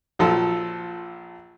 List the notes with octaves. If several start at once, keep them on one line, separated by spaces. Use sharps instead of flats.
A#1 A#2 F3 F#3 A4